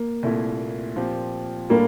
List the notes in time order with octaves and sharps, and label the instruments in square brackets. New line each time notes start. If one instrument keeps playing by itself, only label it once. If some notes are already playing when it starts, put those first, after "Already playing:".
Already playing: [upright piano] A#3
[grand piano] C2 A#2 A3 E4
A#2 F3 C4 G4
[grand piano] A2 G3 D4 A4 [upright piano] A#3